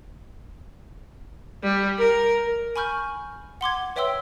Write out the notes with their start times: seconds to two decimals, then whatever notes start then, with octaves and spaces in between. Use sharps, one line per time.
1.63 G3
1.99 A#4
2.76 G#5 B5 C#6 F6 G6
3.61 F#5 C6 D6 G#6
3.96 B4 C#5 E5 G5 C6 E6